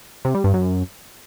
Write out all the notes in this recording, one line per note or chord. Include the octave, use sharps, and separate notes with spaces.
C3
G3
G2
F#2